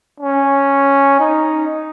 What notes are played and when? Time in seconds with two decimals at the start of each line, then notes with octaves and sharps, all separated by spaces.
0.20 C#4
1.20 D#4